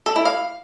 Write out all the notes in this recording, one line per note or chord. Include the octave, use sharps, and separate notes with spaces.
A4
E4
F5